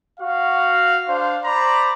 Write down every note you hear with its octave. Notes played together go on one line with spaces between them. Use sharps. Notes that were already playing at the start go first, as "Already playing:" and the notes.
F#4 F5
D4 C5 F5
C5 D5 A#5 B5